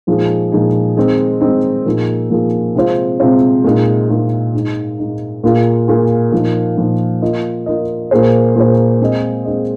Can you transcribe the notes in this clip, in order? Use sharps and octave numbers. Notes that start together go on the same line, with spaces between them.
A#2 F3 G#3 D#4 G#4
A#2 F3 G#3 D#4 G#4
D#3 G#3 C4 D#4
D#3 G#3 C4 D#4
A#2 F3 A#3 D#4 G#4
A#2 F3 A#3 D#4 G#4
C3 G#3 C4 F4 C5
C3 G#3 C4 F4 C5
A#2 G#3 D#4
A#2 G#3 D#4
G#2 G#3 D#4
G#2 G#3 D#4
A#2 A#3 F4 G#4
A#2 A#3 F4 G#4
A#2 F3 A#3 D#4
A#2 F3 A#3 D#4
A#3 F4 A#4 D#5
A#3 F4 A#4 D#5
A#2 A#3 G#4 C5
A#2 A#3 G#4 C5
G#3 C4 G#4 D#5
G#3 C4 G#4 D#5